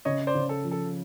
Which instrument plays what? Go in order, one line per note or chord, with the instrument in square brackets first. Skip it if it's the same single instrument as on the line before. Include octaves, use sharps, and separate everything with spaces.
[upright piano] C#3 [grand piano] C#5 D#5
[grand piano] C5 D5
[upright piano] C#3
[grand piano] A4
[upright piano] F3
[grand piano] A4